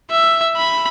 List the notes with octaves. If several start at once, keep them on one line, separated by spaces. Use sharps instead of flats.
E5
B5